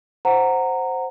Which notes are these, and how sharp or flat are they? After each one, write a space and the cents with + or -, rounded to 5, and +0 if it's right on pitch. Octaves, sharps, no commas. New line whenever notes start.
C5 +0 F#5 +0 A#5 -15